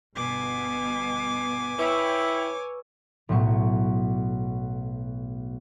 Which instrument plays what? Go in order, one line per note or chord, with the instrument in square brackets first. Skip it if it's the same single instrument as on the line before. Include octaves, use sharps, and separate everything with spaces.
[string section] G1 B2 [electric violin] G#5 D6
[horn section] E4 G5 [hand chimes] B4 C#6 E6 [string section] C#5
[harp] B1 A2 F#3 C#6